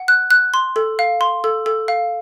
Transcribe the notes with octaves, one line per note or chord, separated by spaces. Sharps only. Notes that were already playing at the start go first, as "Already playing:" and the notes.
Already playing: F#5
F#6
F#6
C6
A4
F5
C6
A4
A4
F5